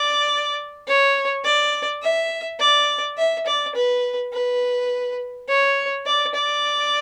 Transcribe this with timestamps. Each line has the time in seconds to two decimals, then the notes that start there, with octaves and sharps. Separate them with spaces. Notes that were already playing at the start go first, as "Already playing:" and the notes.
Already playing: D5
0.87 C#5
1.44 D5
2.02 E5
2.60 D5
3.17 E5
3.46 D5
3.75 B4
4.33 B4
5.48 C#5
6.06 D5
6.34 D5